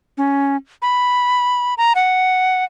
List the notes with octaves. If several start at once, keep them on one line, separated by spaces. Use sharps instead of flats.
C#4
B5
A#5
F#5